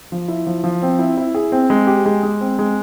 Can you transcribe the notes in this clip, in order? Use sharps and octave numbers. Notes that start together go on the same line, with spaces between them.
F3
E4
F3
F3
C4
E4
E4
G#4
C4
G#3
G4
G#3
G#3
C4
G#3